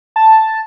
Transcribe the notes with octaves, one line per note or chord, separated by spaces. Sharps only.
A5